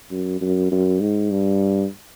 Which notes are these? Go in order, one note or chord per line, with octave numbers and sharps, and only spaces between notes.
F#2
F#2
F#2
G#2
G2